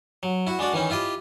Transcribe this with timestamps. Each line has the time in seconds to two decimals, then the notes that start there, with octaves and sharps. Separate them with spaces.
0.23 F#3
0.47 E4 F#4
0.59 G#3 D4 F#4 D5
0.73 D#3 E3 C#4 D#4
0.90 E4 F4 G4 D#5